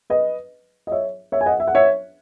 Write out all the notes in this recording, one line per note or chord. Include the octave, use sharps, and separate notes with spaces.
B4 D#5
D#5
C#5 E5
C#5 E5
G#5
D#5 F#5
E5
F#5
C#5 E5